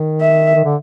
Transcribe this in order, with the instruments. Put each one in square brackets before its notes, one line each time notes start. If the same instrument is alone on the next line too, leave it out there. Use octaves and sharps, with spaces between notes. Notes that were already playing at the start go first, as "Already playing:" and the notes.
Already playing: [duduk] D#3
[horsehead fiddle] E5
[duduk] D#3
D3